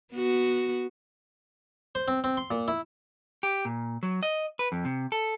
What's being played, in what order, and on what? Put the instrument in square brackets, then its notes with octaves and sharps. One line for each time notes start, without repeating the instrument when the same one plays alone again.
[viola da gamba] B3 F#4
[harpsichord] C5
C4
C4
C6
A#2
E4
[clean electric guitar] G4
A#2
F#3
D#5
B4
F2
C3
A4